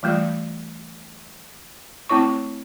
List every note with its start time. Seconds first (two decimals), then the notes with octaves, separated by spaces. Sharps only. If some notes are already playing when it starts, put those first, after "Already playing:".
0.03 E3 G3 A3 F4 D5
2.09 A3 C4 E4 C#5 C#6